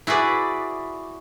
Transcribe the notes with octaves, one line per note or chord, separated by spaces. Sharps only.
E4 F#4 G#4 B4 D5